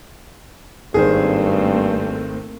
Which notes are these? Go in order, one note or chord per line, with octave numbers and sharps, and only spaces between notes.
G#1 G2 D#3 A3 A#3 C4 G#4 C5